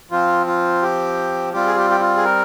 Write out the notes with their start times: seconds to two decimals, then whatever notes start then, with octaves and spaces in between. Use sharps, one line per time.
0.11 F3 C4 F4
0.47 F4
0.82 G4
1.53 G3 C4 F4 G4
1.67 G#4
1.76 G4
1.90 G4
2.00 F4
2.17 G#4
2.24 A#4